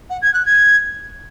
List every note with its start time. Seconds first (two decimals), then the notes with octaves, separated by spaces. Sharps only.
0.10 F#5
0.22 G#6
0.34 F#6
0.45 G#6